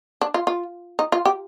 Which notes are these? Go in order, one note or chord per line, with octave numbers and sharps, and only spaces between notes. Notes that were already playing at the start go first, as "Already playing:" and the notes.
D4
F4
F4
D#4
F4
G4